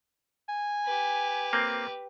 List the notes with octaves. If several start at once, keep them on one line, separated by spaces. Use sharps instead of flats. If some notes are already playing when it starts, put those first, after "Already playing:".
G#5
G4 B4
A#3 C4